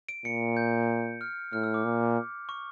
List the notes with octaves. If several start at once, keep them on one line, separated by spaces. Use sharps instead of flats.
D7
A#2 C#7
G6
F6
A2 F6
E6
D6
A#2
C#6